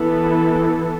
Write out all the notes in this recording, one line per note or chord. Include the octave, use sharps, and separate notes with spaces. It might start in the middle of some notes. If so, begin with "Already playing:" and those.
Already playing: E3 B3 A4